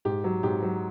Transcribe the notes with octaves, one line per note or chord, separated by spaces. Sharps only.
G#2 G4
F#3
G#2 G4
F#3